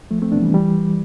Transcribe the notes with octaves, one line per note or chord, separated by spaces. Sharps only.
C2 F3 A3
A3 C4
C3 E3 B3 D4
E3 G3
E3 G3